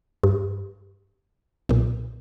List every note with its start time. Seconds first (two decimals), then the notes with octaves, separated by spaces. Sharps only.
0.23 G2
1.69 B1 A#2